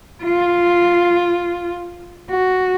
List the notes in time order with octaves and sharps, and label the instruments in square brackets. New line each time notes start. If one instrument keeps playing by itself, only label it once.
[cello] F4
F#4